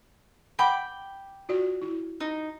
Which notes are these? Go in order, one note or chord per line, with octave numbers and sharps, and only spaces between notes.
F#5 G5 B5 D6
F4 F#4 D5
E4
D#4